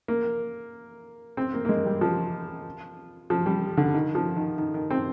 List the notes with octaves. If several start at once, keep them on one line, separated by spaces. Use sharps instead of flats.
A#3
C4
A#3
A#3
G#3
G3
F3
F3
G3
D3
D#3
F3
D#3
D#3
D#3
C4